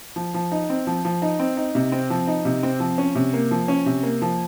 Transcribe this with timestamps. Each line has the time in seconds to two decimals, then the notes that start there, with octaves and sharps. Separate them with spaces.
0.16 F3
0.34 F3
0.52 D#4
0.70 C4
0.87 F3
1.05 F3
1.22 D#4
1.40 C4
1.57 D#4
1.75 C3
1.92 C4
2.10 F3
2.27 D#4
2.45 C3
2.63 C4
2.80 F3
2.98 C#4
3.15 C3
3.34 A#3
3.51 F3
3.68 C#4
3.86 C3
4.03 A#3
4.22 F3